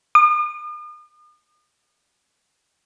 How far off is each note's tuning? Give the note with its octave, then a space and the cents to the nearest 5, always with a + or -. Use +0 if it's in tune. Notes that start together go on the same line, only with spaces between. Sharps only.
D#6 -45